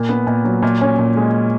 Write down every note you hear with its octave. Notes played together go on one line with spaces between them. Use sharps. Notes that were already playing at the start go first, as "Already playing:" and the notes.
Already playing: A#2 A#3
B3
A#2
F#3
A#2
C#4
A#2
G#3